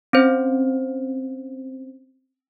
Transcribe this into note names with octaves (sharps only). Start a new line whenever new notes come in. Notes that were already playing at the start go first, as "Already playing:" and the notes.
C4 C#4 C5